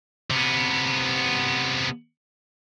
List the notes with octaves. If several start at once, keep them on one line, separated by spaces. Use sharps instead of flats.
C3 B3